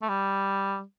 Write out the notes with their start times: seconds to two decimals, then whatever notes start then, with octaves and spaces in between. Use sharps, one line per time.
0.02 A3
0.09 G3